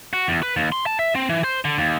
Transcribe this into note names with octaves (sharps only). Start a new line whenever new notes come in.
F#4
E2
B4
D#2
C6
A5
E5
C4
E3
C5
D3
D#2